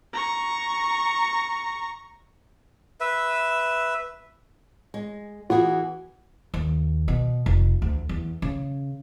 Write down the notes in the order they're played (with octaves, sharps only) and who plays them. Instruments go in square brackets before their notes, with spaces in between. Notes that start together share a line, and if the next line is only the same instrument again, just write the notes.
[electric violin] A#5 C#6
[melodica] B4 E5
[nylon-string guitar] G#3
[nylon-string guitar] E3 B3 G#4 [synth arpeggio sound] F4 [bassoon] F#4
[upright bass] D#2
B2
F1
D2
E2
C#3